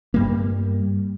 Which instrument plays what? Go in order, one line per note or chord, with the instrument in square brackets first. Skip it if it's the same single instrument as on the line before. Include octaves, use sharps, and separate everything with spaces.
[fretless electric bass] G2 G3 A#3